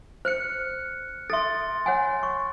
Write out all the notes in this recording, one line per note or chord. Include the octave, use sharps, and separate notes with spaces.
C5 F6 F#6 C#7
A4 E5 C6 A6
C#5 F#5 G#5
C#6